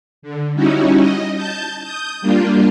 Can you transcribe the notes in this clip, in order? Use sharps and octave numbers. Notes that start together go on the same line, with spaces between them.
D3
G3 C#4 D#4 E4 F#4
D#5
A5 G6
D#6 G6
G3 A#3 D4 F4